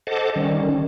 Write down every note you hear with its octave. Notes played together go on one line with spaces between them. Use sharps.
A4 C5 D#5 F#5 A5 D6
D#3 G3 C#4